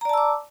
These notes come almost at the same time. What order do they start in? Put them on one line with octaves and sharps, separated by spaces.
A#5 D5 A5 E6 D6